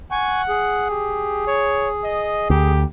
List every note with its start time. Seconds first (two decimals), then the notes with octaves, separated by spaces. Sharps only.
0.11 F#5 G#5 C#6
0.49 G#4
0.90 G4
1.47 C#5
2.04 D#5
2.50 D2 G4